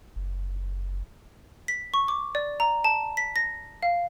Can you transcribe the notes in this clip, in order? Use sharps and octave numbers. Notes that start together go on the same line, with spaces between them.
F#1
B6
C#6
D6
D5
A#5
A5
B6
A#6
F5